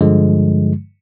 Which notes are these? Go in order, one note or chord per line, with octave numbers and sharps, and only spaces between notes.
G2 D3 F3 G#3